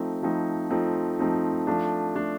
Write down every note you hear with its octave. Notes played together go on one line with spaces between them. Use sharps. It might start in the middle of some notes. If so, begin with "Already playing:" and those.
Already playing: F3 A3 C4 D#4
F3 A3 C4 D#4
F3 A3 C4 D#4
F3 A3 C4 D#4
F3 A3 D4
F3 A3 D4